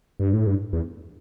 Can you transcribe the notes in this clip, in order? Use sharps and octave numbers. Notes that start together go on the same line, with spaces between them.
G2
A2
G2
E2